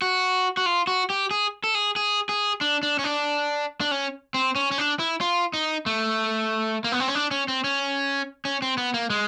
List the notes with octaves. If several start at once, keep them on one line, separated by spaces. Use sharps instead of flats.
F#4
F#4
F4
F#4
G4
G#4
A4
G#4
G#4
G#4
D4
D4
C#4
D4
D4
C#4
C4
C#4
C#4
D4
E4
F4
D#4
A3
A#3
B3
C4
C#4
D4
C#4
C4
C#4
C#4
C4
B3
A#3
G#3